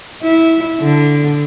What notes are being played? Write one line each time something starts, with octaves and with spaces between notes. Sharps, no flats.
E4
D3